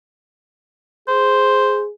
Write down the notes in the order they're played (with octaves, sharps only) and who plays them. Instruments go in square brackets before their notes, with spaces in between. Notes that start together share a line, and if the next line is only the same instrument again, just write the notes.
[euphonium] G#4 [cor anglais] C5